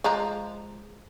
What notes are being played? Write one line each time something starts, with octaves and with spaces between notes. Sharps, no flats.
F3 G#3 A#5